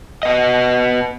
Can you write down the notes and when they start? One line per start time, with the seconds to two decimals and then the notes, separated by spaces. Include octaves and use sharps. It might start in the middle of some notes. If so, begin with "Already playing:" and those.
0.23 B3 D#5